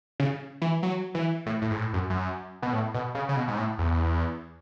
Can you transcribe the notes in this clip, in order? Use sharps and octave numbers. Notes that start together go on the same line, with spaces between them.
C#3
E3
F#3
E3
A2
A2
G#2
A2
F#2
F#2
B2
A2
B2
C#3
C#3
B2
G#2
A2
E2